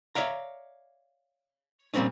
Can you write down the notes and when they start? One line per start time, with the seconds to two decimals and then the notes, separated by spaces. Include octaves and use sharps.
0.15 C#5 D5 E5 F5 A#5
1.94 A#2 G3 A#3 C4 C#4 D#4